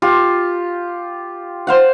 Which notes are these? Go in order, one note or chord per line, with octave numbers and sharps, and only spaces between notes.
F4 G4
C5 F5 F#5